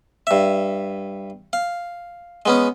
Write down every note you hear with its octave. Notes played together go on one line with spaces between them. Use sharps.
G2 E5
F5
G#3 B3 C#4